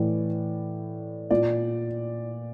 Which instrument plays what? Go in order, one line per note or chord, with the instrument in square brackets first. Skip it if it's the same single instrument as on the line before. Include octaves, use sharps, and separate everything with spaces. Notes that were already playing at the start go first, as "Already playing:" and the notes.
Already playing: [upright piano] A2 E3 D5
A#2 D5